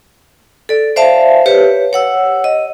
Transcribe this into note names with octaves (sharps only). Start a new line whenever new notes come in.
A4 D5
C5 D5 E5 F5 A5
G4 B4 C#5
C#5 F#5 E6
D#5